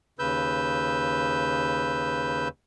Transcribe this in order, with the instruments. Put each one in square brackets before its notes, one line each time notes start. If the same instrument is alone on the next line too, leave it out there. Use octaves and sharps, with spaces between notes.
[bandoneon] D#2 C#3 B4 E6 G6